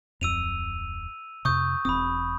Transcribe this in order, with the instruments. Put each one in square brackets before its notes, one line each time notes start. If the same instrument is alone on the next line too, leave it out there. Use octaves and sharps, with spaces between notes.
[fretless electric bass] D1 F2 [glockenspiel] E6 D#7 F7
[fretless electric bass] F2 C3 [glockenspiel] C#6 D#6 G6
[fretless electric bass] E1 C4 [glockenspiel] B5 D#6